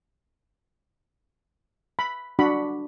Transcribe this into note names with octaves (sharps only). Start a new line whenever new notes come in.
B5
D4 F#4 B5